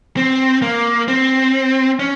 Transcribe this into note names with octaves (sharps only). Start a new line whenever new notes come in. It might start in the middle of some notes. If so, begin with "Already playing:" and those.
C4
A#3
C4
C#4